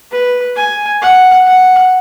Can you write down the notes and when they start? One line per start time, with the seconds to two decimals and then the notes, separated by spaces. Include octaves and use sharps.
0.11 B4
0.56 G#5
1.02 F#5
1.47 F#5